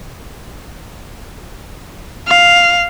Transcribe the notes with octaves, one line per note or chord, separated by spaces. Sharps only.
F5